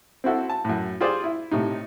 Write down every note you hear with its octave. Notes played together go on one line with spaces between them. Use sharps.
C4 E4 F#4 A4
A5
F#2 A2
F4 G4 G#4 C5 D5
E4
A2 C3 D#4